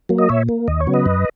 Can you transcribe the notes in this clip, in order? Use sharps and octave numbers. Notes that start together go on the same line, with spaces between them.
F#3 A#3
D#5
A#2 C#5 E5
A#3
D#2 D#5
C#5
C#3 F#3 B3
B4 D#5
F#2